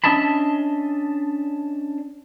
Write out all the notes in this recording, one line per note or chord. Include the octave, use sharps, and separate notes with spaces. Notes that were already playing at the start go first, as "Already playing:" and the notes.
C#4 D4 D#5 E5 A5 B5